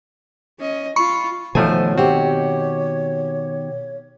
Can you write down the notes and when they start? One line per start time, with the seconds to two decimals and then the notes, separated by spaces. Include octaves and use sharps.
0.60 C#4 D#5
0.96 F4 B5 C#6 C#7
1.55 B2 D#3 F3 A3 C5 C#5 G#5
1.98 C4 F#4 G4